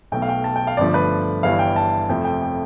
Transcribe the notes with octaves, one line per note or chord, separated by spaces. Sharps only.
B1 B2 A3 G5
F5
G5
A5
G5
F5
G1 G2 D3 F3 A3 D5
B4
G1 G2 E3 G3 F5
G5
A5
F2 C3 F3 A3 G5
G5
G5